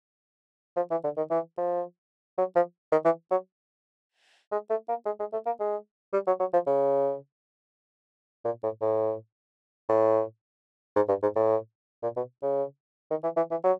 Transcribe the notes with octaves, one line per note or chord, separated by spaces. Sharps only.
F3
E3
D3
D#3
E3
F3
F#3
F3
D#3
E3
F#3
G#3
A3
A#3
G#3
G#3
A3
A#3
G#3
G3
F#3
F#3
F3
C#3
A#2
A2
A2
A2
G#2
G2
G#2
A2
A#2
B2
C#3
D#3
E3
E3
E3
F#3